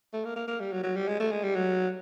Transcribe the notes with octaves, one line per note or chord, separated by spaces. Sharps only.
A3
A#3
A#3
A#3
G3
F#3
F#3
G3
G#3
A3
G#3
G3
F#3